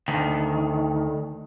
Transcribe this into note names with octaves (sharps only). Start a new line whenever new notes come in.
D2 D#3